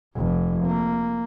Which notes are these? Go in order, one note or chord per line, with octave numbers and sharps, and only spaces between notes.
F1 F2
A#3